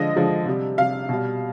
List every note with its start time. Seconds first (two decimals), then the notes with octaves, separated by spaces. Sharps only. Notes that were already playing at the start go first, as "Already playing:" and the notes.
Already playing: D3 F3 G#3 D#5
0.16 D3 F3 G#3
0.46 C3 G3
0.78 C3 G3 F5
1.09 B2 G3